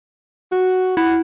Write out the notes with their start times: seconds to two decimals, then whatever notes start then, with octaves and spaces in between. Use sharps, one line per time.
0.52 F#4
0.97 E4 F#5